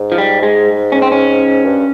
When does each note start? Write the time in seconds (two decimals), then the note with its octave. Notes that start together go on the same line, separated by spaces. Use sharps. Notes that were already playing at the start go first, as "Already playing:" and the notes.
Already playing: G#2
0.12 F3
0.18 G3
0.43 G#3
0.92 C#4
1.02 C4
1.12 C#4
1.66 G2